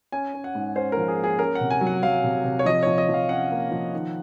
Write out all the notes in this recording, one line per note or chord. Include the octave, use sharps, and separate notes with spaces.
C#4 G#5
C#4
F#5
G#2
C#4 C5
F3 A#4
G#4
A#3
G#4
C#4 A#4
F#5
C3
G#5
F#3
F#5
F#3 F5
C3
C3
C#5
F3 D#5
F3 C#5
D#5
F3
F5
C#4 F#5
A#3
F3
D#3